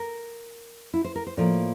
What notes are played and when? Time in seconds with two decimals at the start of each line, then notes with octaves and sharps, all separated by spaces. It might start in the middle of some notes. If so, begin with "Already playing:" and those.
Already playing: A#4
0.94 E4
1.04 C5
1.16 A#4
1.27 C5
1.37 A2 F3 A#3 D5